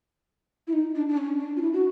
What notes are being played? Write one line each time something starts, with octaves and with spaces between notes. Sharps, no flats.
E4
D#4
D4
D4
C#4
D4
F4
E4
F#4